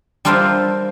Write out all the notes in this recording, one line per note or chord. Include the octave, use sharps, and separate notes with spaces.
G3 D4 F4 A#4 C5 E5